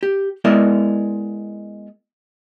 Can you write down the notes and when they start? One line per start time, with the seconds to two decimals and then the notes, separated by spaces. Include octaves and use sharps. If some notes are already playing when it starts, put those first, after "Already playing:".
0.03 G4
0.45 G#3 B3 E4 A#4 D5 E5